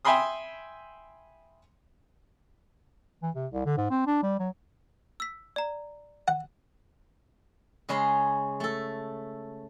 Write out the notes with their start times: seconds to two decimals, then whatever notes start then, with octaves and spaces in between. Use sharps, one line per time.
0.05 E5 G5 G#5 B5 C6 D#6
3.23 E3
3.35 C3
3.52 C2
3.66 D3
3.77 G#2
3.91 C4
4.06 D4
4.23 G3
4.39 F#3
5.20 E6 B6
5.56 D5 A#5
6.28 F#5
7.89 C#3 G#3 C#4 G#4 B5 C6
8.60 A3 A4